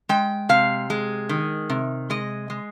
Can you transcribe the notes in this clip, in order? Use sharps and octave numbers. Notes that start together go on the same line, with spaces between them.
G#3 G5
C3 F5
G#3
D#3
C3
G#3 D#5
G#3